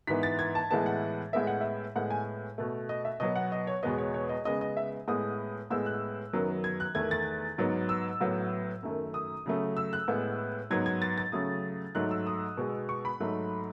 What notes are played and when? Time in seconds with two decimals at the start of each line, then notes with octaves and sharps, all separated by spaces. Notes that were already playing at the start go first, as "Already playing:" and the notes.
0.07 G#2 E3 B3 B6
0.23 A6
0.39 G#6
0.55 A5
0.71 A2 E3 G#3 B3 A5
0.86 F#5
1.33 A2 G#3 B3 E5
1.47 F#5
1.61 E5
1.96 A2 G#3 B3 F#5
2.11 G#5
2.58 B2 A3
2.89 D#5
3.05 E5
3.20 B2 F#3 B3 D#5
3.36 F#5
3.52 D#5
3.67 C#5
3.83 E2 B2 G#3 B3 D#5
3.98 C#5
4.14 C#5
4.29 D#5
4.45 C#3 G#3 B3 D#5
4.61 D#5
4.77 E5
5.08 A2 G#3 B3 D#6
5.70 A2 G#3 B3 E6
5.86 F#6
6.33 F#2 D#3 F#3 B3
6.64 G#6
6.80 F#6
6.95 E2 D#3 A3 G#6
7.11 A6
7.58 G#2 F#3 B3
7.89 E6
8.21 A2 F#3 B3
8.83 F#2 D#3 A3
9.14 D#6
9.46 C#3 F#3 A3
9.77 E6
9.93 F#6
10.08 A2 G#3 B3
10.70 G#2 F#3 B3 G#6
10.86 G#6
11.02 A6
11.18 A6
11.32 C#3 F#3 A3 D#6
11.95 G#2 F#3 A3 F#6
12.11 E6
12.27 D#6
12.57 B2 G#3 B3
12.89 C#6
13.05 B5
13.20 G#2 F#3 A3